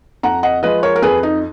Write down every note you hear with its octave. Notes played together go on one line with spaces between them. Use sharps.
F2 F#5 A#5
D#5 F#5
F3 G#3 B4 D#5
A#4 C#5
A#4
F2 G#4 B4
D#4